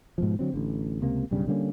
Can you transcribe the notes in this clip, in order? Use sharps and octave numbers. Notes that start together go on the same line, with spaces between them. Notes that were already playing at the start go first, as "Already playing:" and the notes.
G#2 B2 F3
D3 F#3 C4
A1 D3
C#2 C3 A#3
B1 G2 C#3 G3
D3 G3 A#3 C#4